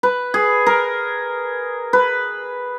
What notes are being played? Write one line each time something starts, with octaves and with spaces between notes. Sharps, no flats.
B4
G#4
A#4
B4